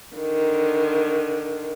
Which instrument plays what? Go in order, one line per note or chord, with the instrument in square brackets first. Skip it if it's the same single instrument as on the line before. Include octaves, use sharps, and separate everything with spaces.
[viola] D3 D#3